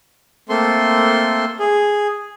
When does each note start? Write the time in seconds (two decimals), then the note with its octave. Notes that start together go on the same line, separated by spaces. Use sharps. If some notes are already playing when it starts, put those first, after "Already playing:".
0.49 A3 A#3 C4 A4 C6
1.60 G#4